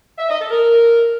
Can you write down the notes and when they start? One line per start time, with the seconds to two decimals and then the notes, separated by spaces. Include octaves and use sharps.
0.18 E5
0.29 D#5
0.40 A4
0.51 A#4